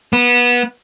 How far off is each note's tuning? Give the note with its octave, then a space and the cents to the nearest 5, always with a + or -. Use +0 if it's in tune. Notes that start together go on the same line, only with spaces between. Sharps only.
B3 -20